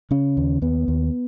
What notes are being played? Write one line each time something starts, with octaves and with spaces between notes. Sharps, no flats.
C#3 C#4
D#2
D#2 B3
D#2